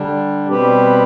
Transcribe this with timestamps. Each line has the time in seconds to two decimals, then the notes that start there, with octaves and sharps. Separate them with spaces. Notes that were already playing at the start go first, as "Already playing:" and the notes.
Already playing: D3 G3 D4
0.48 B2 G3 C4 G4 B4